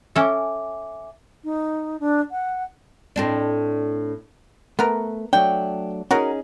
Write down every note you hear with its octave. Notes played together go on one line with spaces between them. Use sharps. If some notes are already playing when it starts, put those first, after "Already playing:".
C#4 A4 E5 G#5 D6
D#4
D4
F#5
A2 C4 D4
A3 B3 A#4
F#3 A3 D4 G5
C#4 D#4 F#4 G#4 A#4